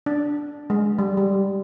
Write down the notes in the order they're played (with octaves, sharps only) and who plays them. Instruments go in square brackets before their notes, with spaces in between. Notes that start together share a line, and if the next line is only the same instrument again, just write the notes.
[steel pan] D4
G#3
G3
G3